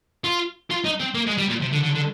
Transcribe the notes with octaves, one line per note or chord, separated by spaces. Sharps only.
F4
F4
D#4
C4
A#3
G#3
G3
A#2
C3
D3
D3
D3